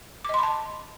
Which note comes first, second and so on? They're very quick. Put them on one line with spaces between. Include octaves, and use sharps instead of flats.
D6 D#5 C6 B5 A5